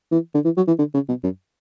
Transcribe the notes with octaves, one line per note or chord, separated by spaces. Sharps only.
E3
D3
E3
F#3
E3
D3
C#3
B2
F#2